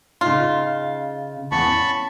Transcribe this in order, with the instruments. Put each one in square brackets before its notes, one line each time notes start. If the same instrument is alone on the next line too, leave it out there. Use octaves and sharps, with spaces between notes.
[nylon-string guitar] C#3 D#4 [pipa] F4
[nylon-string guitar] E2 [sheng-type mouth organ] A5 B5 C#6
[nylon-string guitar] C#4